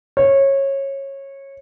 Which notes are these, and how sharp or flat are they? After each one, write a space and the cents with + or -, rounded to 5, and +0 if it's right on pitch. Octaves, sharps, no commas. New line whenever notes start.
C#5 -20